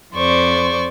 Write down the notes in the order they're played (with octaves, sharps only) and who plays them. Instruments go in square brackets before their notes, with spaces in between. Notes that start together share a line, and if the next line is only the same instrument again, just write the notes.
[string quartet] F2 C5 D5 C#6